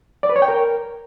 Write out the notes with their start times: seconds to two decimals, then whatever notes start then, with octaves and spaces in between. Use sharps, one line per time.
0.23 D5
0.29 B4
0.36 C#5
0.42 G5
0.48 A#4